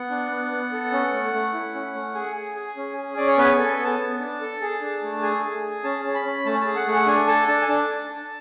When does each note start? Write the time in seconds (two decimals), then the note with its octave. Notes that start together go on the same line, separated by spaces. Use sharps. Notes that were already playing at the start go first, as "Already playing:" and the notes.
Already playing: B3 F#5
0.10 D4
0.31 B3
0.51 B3
0.72 A4
0.92 C#4
1.13 A3
1.33 A3
1.53 E4
1.75 C#4
1.94 A3
2.15 G#4 G#5
2.36 G#4
2.56 G#4
2.77 C#4
2.97 G#4
3.17 C#4 D5
3.27 C#5
3.38 B3 B4
3.54 G#5
3.59 A4
3.69 G#5
3.79 B3 A5
4.00 B3
4.20 D4
4.41 A4
4.61 G#4
4.82 D4
5.02 A3
5.22 G#4 G#5
5.43 G#4
5.63 G#4
5.84 C#4 A5
6.05 C#4
6.15 B5
6.25 C#4
6.46 A3 A5
6.61 A5
6.66 G#4
6.76 F#5
6.87 A3 F#5
7.07 D4 G#5
7.27 A4 A5
7.48 D4 A5
7.62 G#5
7.68 D4 A5
7.89 D4
8.09 D4